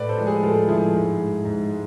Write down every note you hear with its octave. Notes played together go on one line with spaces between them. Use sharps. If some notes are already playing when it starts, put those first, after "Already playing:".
Already playing: A2 B4 D5
A4 C5
F3 G#3
G#4 B4
A2 F4 A4
F3 G#3 E4 G#4
G#2
G#3
G#2
G#3